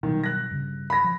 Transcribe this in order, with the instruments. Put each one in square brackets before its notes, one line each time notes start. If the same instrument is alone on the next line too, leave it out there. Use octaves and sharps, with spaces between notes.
[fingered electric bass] B2 F#3 G3 [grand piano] D#3
[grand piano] F#6 A#6
[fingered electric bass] G2 C#3
[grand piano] B5 A#6
[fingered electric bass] F3